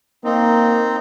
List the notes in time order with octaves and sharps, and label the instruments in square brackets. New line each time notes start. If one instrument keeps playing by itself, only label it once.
[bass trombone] A#3 [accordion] C4 D#4